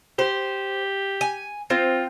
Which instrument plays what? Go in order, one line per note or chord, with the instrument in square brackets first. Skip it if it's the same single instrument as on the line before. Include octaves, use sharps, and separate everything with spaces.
[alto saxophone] G4 [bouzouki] C5
[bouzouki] G#5
[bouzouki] C4 C5 [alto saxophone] F4